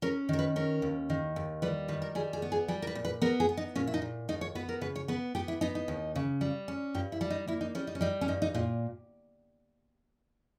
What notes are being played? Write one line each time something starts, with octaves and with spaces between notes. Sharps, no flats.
C#4 A#4
D#3 A#4
B4
C#4 A#4
D#2
D#3
D#2
G3 B4
D#3 B4
A#4
G3 G#4
G#4
B3
G#4
G3 G#4
A#4
B4
A#2
B4
B3 A#4
G#4
B3
D#4
A#2 C#4
E4
D#4
A#2
D#2 D#4
C#5
B3 B4
A#4
C#3 B4
C#5
B3 B4
B3 G4
E4
B3 D#4
D#4
D#2
C#3
G3
C#4
G2 G4
E4
G3
D#4
A#3 E4
D#4
G3 C#4
D#4
C#4
G3 D#4
C#4
G2 D#4
D#4
A#2 D#4